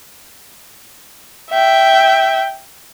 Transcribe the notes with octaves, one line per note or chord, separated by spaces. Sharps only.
E5 G5